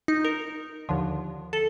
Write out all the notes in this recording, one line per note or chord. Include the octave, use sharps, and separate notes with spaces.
D#4
A#4
D#2 D3 F3
A4